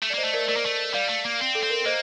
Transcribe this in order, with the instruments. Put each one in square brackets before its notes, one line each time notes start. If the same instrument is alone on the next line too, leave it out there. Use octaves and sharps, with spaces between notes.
[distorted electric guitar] A3
[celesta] D5
[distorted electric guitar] A#3 [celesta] C5 D#5
[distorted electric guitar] A3
[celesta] A#4 D5
[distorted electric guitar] A3 [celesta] A#4 D5
[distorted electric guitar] A#3
A3
[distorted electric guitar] G3 [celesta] D5 F5
[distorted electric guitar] A3
A#3
C4
[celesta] A4
[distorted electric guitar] C4
[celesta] A#4
[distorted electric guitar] A#3 [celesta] C5 D#5